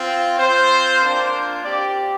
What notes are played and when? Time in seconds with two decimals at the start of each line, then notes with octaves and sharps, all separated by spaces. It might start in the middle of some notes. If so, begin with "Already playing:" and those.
Already playing: C4 F4
0.39 C4 F4 C5
1.02 A#3 D4 F4
1.64 C4 G4 D5